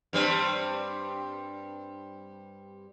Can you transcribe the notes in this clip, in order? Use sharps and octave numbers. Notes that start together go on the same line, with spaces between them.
G2 G3 C4